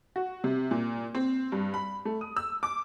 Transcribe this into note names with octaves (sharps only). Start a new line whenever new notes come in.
F#4
C3
A#2
C4
G2
B5
A3
D#6
E6
D6